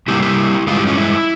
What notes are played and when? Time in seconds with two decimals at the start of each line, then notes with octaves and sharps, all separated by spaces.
0.08 C3 G3 A#3 E4 G4
0.22 E4 G4
0.67 G2 E3 G#3 F4
0.77 E4 G4
0.87 C#4 F4
0.97 E4